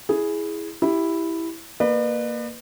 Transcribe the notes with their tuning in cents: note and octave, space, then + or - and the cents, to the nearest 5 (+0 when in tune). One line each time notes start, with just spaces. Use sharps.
E4 +0 G#4 +0
E4 +0 G4 +0
A#3 +0 B4 +0 D5 +45